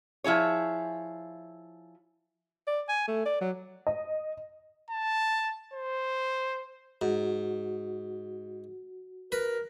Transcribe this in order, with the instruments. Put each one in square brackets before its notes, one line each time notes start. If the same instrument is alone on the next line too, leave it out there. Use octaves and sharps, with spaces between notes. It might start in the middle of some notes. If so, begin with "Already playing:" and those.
[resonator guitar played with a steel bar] F3 E4 G#4 C#5
[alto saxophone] D5
G#5
A3
D5
F#3
[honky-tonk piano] D#5
[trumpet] A5
C5
[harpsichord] G#2 [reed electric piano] F#4
[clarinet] A#4 [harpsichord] B4